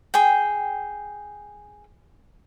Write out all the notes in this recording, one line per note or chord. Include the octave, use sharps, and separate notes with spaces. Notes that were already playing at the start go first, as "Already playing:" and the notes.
G#4 G5